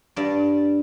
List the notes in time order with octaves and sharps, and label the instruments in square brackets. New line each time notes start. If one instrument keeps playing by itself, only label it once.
[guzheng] G2 D5